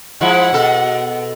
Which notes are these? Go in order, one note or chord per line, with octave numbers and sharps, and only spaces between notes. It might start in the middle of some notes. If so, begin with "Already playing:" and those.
F3 G#3 E4 F#5
B2 A4